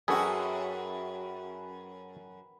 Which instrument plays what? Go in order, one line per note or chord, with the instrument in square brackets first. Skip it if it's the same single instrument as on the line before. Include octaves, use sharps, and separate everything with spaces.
[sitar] F#2 F#4 [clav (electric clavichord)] G#4 A4 [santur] B4 G5